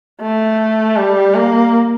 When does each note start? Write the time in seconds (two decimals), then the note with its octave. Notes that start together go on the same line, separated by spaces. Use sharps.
0.21 A3
0.97 G3
1.35 A#3